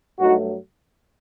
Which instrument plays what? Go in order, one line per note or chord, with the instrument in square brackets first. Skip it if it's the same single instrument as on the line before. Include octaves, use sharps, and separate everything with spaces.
[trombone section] G2 F#3 A3 D#4 F#4